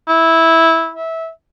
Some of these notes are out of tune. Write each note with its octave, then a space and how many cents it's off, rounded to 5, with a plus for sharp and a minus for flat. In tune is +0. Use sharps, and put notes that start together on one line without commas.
E4 -10
E5 -15